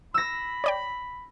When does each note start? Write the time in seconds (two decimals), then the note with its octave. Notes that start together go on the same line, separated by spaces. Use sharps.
0.14 B5 E6 A#6
0.64 C#5 D5 G5